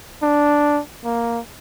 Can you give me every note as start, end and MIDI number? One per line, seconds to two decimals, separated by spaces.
0.23 0.81 62
1.05 1.40 58